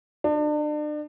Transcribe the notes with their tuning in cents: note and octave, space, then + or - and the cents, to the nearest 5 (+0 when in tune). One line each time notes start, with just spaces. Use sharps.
D4 +35